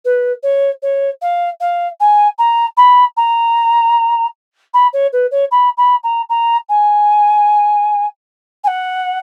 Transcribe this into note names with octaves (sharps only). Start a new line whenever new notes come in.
B4
C#5
C#5
F5
F5
G#5
A#5
B5
A#5
B5
C#5
B4
C#5
B5
B5
A#5
A#5
G#5
G#5
F#5